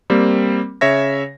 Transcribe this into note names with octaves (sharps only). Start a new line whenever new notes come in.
G3 A#3 C4
C#3 C#5 E5 A#6